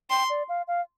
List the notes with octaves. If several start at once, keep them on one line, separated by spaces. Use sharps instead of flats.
G5 C6
D5
F5
F5